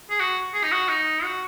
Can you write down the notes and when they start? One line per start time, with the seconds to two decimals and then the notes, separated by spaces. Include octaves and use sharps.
0.10 G#4
0.20 F#4
0.54 G#4
0.63 D#4
0.72 F#4
0.89 D#4
1.23 F#4